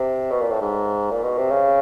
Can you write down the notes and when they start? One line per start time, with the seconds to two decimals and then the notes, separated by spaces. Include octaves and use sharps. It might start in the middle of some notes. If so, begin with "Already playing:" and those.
Already playing: C3
0.31 B2
0.41 A#2
0.51 A2
0.61 G#2
1.11 A#2
1.24 B2
1.38 C3
1.50 C#3